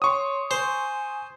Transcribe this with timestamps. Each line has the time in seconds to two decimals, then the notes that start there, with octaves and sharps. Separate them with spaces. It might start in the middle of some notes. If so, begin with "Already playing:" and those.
0.02 C#5 C6 C#6 D#6
0.51 C5 G#5